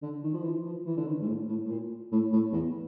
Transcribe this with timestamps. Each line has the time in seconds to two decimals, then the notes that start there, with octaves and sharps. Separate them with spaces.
0.02 D3
0.23 D#3
0.34 F3
0.43 E3
0.65 F3
0.86 E3
0.97 D3
1.07 D#3
1.21 G#2
1.28 A2
1.49 A2
1.65 A2
1.70 A#2
2.12 A2
2.33 A2
2.53 E2